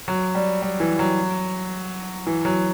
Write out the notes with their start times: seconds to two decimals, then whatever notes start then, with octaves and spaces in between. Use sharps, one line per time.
0.08 F#3
0.35 G3
0.62 G3
0.80 E3
0.99 F#3
2.27 E3
2.45 F#3